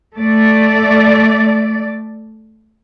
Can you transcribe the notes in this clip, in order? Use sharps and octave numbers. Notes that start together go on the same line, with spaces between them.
A3 D5